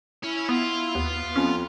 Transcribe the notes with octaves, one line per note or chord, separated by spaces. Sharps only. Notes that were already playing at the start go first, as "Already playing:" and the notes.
C#4 E4
B3 F4
D#2 B3
F2 C#4